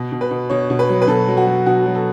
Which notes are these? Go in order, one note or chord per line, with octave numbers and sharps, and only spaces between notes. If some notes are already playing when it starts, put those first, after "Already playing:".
Already playing: B2
B2
B4
B2
B2 C#5
B2
B4
F#3
B4
B2 A4
F#3
F#4
F#3
B2 F#4
F#3
A4